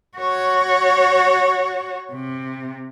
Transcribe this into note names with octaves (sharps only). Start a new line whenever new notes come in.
F#4 C#5
C3